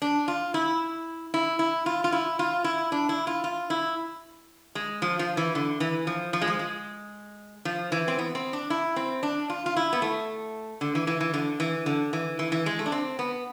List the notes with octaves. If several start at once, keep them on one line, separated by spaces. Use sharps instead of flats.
D4
F4
E4
E4
E4
F4
F4
E4
F4
E4
D4
E4
F4
F4
E4
G#3
F3
F3
E3
D3
E3
F3
F3
G#3
F3
G#3
F3
E3
C4
B3
C4
D4
E4
C4
D4
F4
F4
E4
B3
A3
D3
E3
E3
E3
D3
E3
D3
E3
E3
E3
G#3
A3
D4
C4
B3